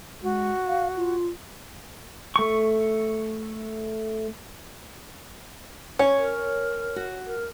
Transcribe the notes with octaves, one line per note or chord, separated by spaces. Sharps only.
G#3 F#4
F5
F4
A3 C#6
C#4 C#5
A#4
F#4
A#4